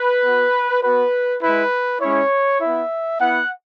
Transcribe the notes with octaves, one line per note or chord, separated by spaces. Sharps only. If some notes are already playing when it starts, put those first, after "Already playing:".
Already playing: B4
B3 F#4
B3 F#4 B4
G#3 E4 B4
G#3 C#4 E4 C#5
B3 E4 E5
B3 E4 F#5